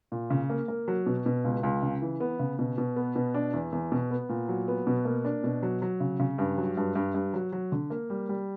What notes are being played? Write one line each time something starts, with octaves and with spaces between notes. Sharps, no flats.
A#2
C#3
A#3
A#3
F#3
B2
B2
C#2
C#2
C#3
E3
B3
C#3
B2
B2
B3
B2
D4
E2
E2
B2
B3
A#2
F#3
B3
B2
A#3
D4
B2
F#3
F#3
C#3
C#3
G2
F#3
G2
G2
G2
F#3
F#3
D3
A#3
G3
G3